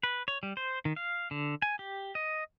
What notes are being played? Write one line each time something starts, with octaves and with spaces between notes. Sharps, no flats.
B4
C#5
G3
C5
D#3
F5
D3
G#5
G4
D#5